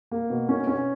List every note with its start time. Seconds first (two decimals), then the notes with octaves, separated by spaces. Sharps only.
0.11 A#3
0.30 B2
0.49 C#4
0.67 C#4